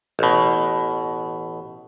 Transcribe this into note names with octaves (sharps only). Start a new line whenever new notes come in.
A1 B2